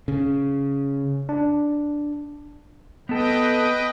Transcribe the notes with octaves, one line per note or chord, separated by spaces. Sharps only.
C#3
D4
B3 A4 B4 D#5 G5